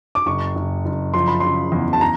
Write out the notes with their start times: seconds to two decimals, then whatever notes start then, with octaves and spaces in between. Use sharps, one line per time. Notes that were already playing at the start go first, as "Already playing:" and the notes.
0.15 D6
0.26 F#1 C#6
0.55 F#1
0.85 F#1
1.14 F3 C6
1.28 B5
1.40 C#3 C6
1.72 E2
1.93 A5
2.01 A#5